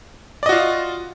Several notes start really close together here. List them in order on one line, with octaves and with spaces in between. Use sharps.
D5 D#5 F#4 F4